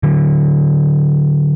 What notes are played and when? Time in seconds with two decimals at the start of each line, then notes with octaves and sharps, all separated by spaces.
0.03 D3 F#3